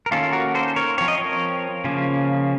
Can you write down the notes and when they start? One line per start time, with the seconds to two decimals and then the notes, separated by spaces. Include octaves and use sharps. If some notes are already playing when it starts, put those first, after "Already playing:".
0.06 A#4
0.11 D#3 A#3 C#4 F4 A4
0.33 F#4 A#4
0.55 A4 C5
0.76 A#4 C#5
0.98 F3 C4 C#5
1.08 D#5
1.18 A#4 C#5
1.84 C#3 F3 A#3 C#4